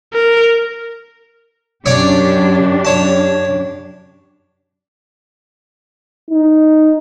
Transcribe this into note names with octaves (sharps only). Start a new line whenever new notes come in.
A#4
F#2 D4 G4 C#5 D5 C#6
C#5 A5
D#4